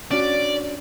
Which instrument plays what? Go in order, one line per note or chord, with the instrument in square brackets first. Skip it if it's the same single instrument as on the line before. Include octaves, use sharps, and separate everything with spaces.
[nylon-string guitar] C#4 D4 F#4 [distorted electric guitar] D5